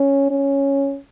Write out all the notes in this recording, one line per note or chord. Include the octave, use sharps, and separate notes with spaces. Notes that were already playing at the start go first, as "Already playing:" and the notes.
Already playing: C#4
C#4